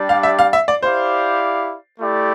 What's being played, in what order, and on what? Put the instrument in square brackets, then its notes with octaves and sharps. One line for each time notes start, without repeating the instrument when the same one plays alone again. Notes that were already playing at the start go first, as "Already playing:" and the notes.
Already playing: [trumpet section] G3 D4 G4 D5
[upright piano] F5
E5
F5
E5
D5
[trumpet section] E4 G4 D5 F5 [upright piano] C5
[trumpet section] A3 E4 G4 D5